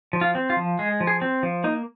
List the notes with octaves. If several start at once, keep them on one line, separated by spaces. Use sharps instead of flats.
F3
F4
C4
F4
F3
G#3 G#4
F3
G#4
C4
F3
A#3 D#4